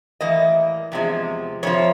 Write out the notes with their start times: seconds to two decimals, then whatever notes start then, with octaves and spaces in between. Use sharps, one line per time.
0.21 A2 E3 G3 A#3 D#5
0.92 E2 C3 F3 G#3
1.63 F2 C3 F3 C#5